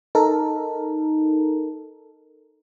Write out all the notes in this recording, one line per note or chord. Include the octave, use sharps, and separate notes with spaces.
D#4 A4 A#4